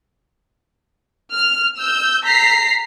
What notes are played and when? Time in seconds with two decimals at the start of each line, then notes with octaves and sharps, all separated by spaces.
1.33 F6
1.77 E6 G6
2.25 A#5 B6 C7